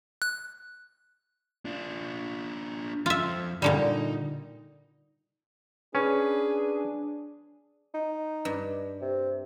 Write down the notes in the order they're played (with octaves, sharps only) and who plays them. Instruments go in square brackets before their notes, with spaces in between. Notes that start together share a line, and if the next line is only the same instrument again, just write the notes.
[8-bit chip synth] F#6
[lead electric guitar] D4 F4
[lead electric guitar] F2 [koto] F4 E5
[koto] A#2 D3 G3 [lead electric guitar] D#4
[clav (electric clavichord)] C#4 [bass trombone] D4 [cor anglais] G#4 [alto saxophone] B4
[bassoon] D#4
[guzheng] G2
[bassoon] C3